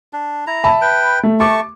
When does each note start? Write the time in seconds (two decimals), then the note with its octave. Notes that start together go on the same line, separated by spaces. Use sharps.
0.13 D4
0.47 E4 A#5
0.64 E5 A5 B5
0.81 B4 G5
1.23 A3
1.40 A3 A5 C#6 D6